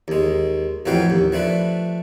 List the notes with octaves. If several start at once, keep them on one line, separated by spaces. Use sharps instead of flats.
D#2 G#3
A1 F2 F#3 B4 F5 G5
D#2
F3 A3 D4 B4